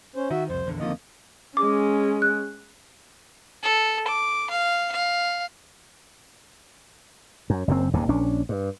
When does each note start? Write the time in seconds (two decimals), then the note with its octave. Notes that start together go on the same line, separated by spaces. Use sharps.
0.16 C#4 C5
0.31 D#3 F#4 E5
0.50 C2 F2 C5
0.65 A#1 E2 D3
0.80 F2 D3 D#3 F3 A#3 D#5
1.57 G#3 C#4 D6
2.22 F#6
3.63 A4
4.08 D6
4.51 F5
4.92 F5
7.50 F#2
7.68 F#1 F#2 C3 C4
7.93 D#1 D#2 G#2 C3
8.09 A#1 C#4 D4
8.49 G2